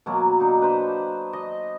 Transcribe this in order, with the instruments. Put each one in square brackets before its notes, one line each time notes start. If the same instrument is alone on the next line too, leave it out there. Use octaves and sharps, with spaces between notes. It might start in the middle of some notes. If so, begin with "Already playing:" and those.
[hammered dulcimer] B2 F#3 A#3
D4 D#4
B4 C5
D#5